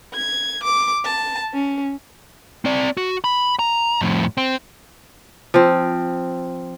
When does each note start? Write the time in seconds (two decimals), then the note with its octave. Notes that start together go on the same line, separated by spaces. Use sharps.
0.14 G#6
0.63 D6
1.04 A5
1.53 C#4
2.65 C4 D5
2.97 F#4
3.24 B5
3.59 A#5
4.01 F2 A2
4.38 C4
5.54 F3 C4